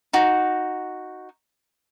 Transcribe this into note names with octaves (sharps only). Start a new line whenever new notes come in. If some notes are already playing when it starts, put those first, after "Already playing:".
D#4 F#4